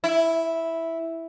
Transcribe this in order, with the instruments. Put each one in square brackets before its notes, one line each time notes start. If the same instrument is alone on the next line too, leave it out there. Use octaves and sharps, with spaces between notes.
[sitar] E4